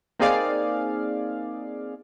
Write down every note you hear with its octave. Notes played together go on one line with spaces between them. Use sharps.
A#3 C4 D#4 G#4 D5 F5